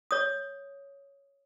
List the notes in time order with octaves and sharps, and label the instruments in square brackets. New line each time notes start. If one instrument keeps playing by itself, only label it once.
[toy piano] C#5 D#6